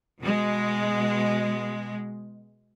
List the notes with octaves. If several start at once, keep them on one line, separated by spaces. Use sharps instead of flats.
B2 G#3